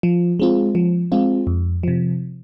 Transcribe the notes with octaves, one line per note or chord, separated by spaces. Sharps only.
F3
G#3 C4 F4
F3
G#3 C4 F4
F2
C3 F3